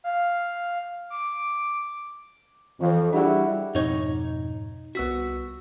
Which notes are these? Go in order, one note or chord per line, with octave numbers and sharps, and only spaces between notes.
F5
D6
F2 E3 C5
G3 D4 E4 F#4 G#4
F2 G#2 B2 D#4 C#5
C2 B3 F#4 E6 B6